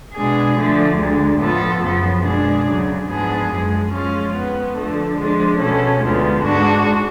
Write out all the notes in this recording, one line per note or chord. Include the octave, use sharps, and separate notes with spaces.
B2 G#3 D4 G#4
D3 F3 A3
D2 D3 G#3
A2 F3 B3 F4 A4
F#2 C#3 F3 B3
B2 G#3 D4 G#4
D2 C#3 F#3
G#2 F3 B3 D4 G#4
F#2 F3 G#3
F3 G#3 C#4 F4
F2 F3 B3
D3 F3 A3
F3 G#3 D4
B2 A3 C#4
D2 D3 F3 G#3 B3
G#2 G#3 D4 F#4